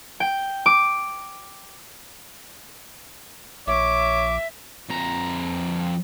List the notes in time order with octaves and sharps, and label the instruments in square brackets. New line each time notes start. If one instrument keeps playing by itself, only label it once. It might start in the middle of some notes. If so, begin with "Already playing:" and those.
[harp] G5
D6
[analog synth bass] A#1 [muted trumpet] C#5 [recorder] E5 [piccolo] D6
[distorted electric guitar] F2 A#5